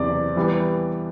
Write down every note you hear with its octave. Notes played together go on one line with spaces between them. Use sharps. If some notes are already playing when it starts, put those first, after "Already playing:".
Already playing: F#1 E2 C3 D5
E3 G3 B3